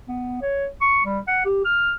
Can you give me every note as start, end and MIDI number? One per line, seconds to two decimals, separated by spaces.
0.08 0.38 59
0.42 0.66 73
0.81 1.02 85
1.05 1.19 55
1.27 1.43 78
1.45 1.62 67
1.65 1.93 89